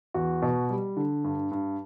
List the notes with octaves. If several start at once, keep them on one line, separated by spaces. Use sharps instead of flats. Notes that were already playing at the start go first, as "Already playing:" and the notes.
E2 F#4
B2
G3
D3
G2
G2